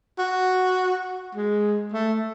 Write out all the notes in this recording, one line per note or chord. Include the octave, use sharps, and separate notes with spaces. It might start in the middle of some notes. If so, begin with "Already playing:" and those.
F#4
G#3
A3